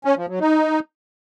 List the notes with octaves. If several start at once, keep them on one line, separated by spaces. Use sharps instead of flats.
C#4
F3
F#3
D#4